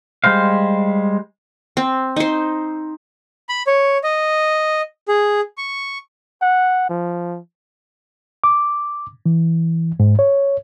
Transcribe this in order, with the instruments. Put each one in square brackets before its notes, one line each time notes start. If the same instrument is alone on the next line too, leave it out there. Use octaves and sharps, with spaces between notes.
[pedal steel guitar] G3 G#3 C5 F5
[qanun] C4
D#4 C5
[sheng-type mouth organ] B5
C#5
D#5
G#4
C#6
[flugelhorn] F#5
F3
[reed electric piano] D6
E3
G#2
C#5